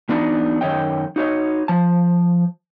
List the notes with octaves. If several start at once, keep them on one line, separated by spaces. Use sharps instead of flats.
E3 B3 D4 D#4 F#4
F#2 D#3 C#5 D#5 G5
D#4 F#4 C#5 D#5
F3 A5